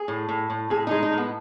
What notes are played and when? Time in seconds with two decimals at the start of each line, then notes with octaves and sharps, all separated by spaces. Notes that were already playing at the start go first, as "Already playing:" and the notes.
Already playing: G#4
0.08 A2
0.29 A2
0.50 A2
0.70 A2 G#4
0.87 G#3 D#4
1.02 D#4
1.12 A2
1.18 B3